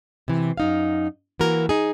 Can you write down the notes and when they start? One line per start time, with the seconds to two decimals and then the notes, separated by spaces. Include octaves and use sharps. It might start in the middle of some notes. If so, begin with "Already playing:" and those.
0.28 C3 E3
0.57 F#2 D#4 F5
1.40 E3 A#3 F#4 A#4
1.69 D#4 G#4